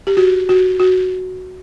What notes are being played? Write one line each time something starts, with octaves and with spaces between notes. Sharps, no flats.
G4
F#4
F#4
F#4